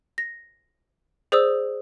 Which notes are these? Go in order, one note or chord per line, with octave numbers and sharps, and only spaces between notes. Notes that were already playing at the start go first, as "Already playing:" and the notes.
A#6
G#4 C5 D5 D#6 E6